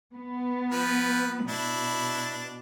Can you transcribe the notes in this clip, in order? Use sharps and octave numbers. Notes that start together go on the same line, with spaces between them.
B3
F3 B4
B2 D4 E4